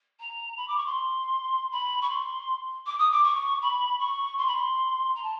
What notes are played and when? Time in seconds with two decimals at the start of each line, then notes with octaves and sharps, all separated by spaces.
0.20 A#5
0.57 B5
0.68 D6
0.77 C#6
0.86 C6
1.72 B5
2.01 C#6
2.10 C6
2.86 D6
2.98 D#6
3.11 D6
3.24 C#6
3.62 B5
3.99 C#6
4.38 C6
4.47 B5
4.57 C6
5.15 A#5
5.23 A5